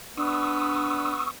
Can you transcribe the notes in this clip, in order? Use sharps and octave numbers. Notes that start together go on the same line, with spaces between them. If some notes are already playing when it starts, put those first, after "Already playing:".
B3 D4 C#6 D#6 E6